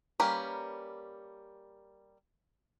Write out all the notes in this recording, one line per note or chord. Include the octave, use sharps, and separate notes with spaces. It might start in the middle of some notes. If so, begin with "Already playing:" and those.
G3 A#3 C#4 A#4 B4